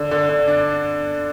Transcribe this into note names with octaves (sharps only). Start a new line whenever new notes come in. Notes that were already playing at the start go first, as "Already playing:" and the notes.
Already playing: D3
D3
D3
D4